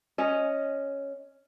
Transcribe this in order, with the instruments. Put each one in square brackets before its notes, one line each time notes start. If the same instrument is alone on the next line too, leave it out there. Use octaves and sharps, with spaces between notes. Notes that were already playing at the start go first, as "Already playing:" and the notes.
[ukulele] C#4 D#5